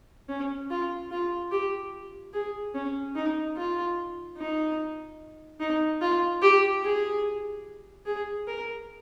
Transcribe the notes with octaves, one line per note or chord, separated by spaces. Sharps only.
C#4
F4
F4
G4
G#4
C#4
D#4
F4
D#4
D#4
F4
G4
G#4
G#4
A#4